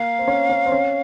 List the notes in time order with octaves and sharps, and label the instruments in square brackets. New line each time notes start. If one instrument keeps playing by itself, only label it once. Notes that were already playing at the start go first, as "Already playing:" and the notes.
Already playing: [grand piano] A#3 [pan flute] F5
[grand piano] C4
C#4
C#4
C4
C#4